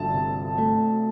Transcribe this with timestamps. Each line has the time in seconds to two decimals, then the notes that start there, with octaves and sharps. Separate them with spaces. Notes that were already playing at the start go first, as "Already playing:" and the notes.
Already playing: G1 A5
0.14 C3
0.58 A3